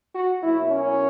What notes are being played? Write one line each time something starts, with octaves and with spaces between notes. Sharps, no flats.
F#4
B2 F#3 A#3 E4
C#4